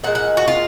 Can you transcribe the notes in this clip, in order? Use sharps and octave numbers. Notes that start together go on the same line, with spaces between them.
A#2 G#3 F#5
F#5
F#4
F4